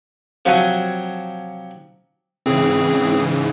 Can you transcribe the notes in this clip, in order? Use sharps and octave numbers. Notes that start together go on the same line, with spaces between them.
C3 F3 F#3 F#4 G#5
G#2 C#3 E3 C4 G#4